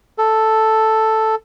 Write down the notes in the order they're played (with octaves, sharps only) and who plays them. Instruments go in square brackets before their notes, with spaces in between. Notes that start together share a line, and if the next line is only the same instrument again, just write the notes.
[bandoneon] A4